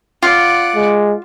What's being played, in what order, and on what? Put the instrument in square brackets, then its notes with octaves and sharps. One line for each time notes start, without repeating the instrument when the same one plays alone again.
[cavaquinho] F4 [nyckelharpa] D5 F#5
[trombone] G#3